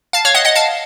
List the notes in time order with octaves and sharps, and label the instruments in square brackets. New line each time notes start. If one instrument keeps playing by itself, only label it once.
[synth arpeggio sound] F5 A5
C#5 F5
D#5 F#5
D#5 F#5
F5 A5